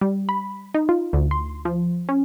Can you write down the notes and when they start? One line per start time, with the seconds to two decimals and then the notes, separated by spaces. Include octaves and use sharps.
0.01 G3
0.29 B5
0.74 D#4
0.89 F4
1.13 D2
1.31 C6
1.65 F3
2.09 C#4